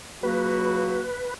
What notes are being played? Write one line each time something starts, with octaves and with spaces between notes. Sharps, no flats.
C#2 F#3 A#3 F#4 B4